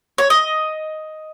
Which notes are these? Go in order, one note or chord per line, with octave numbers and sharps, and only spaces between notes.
C#5
D#5